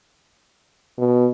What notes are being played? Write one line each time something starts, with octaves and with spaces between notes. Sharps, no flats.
B2